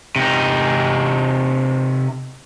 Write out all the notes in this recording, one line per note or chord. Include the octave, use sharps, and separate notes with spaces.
C3 D#4